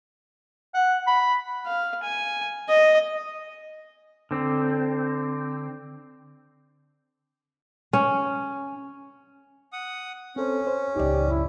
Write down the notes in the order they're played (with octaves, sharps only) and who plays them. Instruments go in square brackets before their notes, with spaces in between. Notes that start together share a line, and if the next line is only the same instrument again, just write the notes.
[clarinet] F#5
B5
[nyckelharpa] F5
G#5
D#5
[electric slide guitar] D3 C4
[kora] C#4
[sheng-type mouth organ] F#5 D#6
[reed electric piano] C4 A4 C5 [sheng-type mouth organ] C#4
[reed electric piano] C5
[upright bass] C#2 A2 [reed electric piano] D#4 D5 [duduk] G4
[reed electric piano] F#2 [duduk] E4